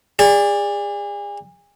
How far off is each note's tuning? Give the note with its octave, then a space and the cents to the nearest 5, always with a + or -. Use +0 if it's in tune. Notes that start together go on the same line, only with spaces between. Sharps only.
G#4 -35 D5 +0